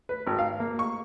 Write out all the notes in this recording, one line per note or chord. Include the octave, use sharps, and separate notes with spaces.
B4
G#1
F5
A#3
C#6